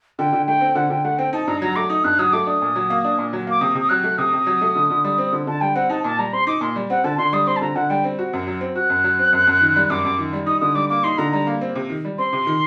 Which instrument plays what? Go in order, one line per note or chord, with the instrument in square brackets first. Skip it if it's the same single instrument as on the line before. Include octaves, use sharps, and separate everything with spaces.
[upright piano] D3 [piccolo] G5
[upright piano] D3
[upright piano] A3 [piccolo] G5
[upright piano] C4
[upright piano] D3 [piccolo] F#5
[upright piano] D3 [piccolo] G5
[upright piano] A3 [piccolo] F#5
[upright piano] C4 [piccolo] G5
[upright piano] D#4 [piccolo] A5
[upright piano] G2 [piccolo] A#5
[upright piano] F#3 [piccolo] A#5
[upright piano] A3 [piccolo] D6
[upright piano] D#4 [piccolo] D#6
[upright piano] G2 [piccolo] F#6
[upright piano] F#3 [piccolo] D#6
[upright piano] A3 [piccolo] D6
[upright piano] D4 [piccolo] D#6
[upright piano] A#2
F#3
A#3
D4
A#2
F#3
[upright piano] A#3 [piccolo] D6
[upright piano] C3 [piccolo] D#6
[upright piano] C3
[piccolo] D#6
[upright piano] F#3 [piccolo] F#6
[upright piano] A3
[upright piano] C3 [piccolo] D#6
[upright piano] C3
F#3
A3
D3
D3
G3
C4
D3
[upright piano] D3 [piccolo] A5
[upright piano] G3 [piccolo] G5
[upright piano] C4 [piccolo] F#5
[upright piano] D#4 [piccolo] A5
[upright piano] A#2 [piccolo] A5
[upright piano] G3 [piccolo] A#5
[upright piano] C4 [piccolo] C6
[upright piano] D#4 [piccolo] D6
[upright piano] A#2 [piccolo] C6
[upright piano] G3
[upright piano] C4 [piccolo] F#5
[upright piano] D3 [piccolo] A5
[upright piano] D3 [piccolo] C6
[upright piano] G3 [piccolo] D#6
[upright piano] C4 [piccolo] C6
[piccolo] A5
[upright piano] D3 [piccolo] A#5
[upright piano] D3 [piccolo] F#5
[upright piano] G3 [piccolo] G5
[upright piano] C4
F#4
F#2
F#3
C4
[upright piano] F#4 [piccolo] F#6
[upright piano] F#2
F#3
C4
F#2
F#2
D#3
G3
[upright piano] F#2 [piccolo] D6
[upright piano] F#2
D#3
G3
[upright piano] D#4 [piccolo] D#6
[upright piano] D3 [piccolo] D#6
[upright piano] G3 [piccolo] D6
[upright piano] A#3 [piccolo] D6
[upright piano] D#4 [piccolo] C6
[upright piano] D3 [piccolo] A#5
[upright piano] G3 [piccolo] A#5
[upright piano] A#3
C4
C3
D#3
G3
[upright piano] C4 [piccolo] C6
[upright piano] C3
D#3